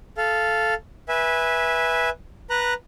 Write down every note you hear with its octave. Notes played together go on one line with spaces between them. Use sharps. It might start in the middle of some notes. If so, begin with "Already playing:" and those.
A4 F5
B4 E5 G#5
B4 A#5 F#6